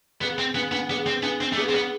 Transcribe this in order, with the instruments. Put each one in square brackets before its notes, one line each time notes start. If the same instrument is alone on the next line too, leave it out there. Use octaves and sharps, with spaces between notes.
[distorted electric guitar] B3 [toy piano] G#4
[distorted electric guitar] C4 [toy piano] B4
[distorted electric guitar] B3 [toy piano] D4
[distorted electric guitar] B3 [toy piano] D4
[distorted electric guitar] B3 [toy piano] G#4
[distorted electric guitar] C4 [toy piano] B4
[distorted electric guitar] B3 [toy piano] D4
[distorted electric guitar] C4 [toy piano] D4
[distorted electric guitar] A3
[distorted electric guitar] B3 [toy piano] G#4
[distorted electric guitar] C4
[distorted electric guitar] B3 [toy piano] B4